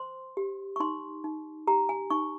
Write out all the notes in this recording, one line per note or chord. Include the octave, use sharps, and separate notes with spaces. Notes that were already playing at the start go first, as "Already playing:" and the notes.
Already playing: C5 C6
G4
C#6
D#4 C6
D#4
G4 A#5
G#5
D#4 C#6